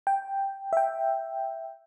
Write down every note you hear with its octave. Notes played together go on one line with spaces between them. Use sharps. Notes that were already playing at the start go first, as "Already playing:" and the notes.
G5
E5 G5